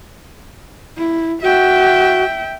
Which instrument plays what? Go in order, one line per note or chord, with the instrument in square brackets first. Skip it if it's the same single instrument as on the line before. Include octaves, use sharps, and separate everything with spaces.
[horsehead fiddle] E4
[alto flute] F#4 [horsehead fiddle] E5 G5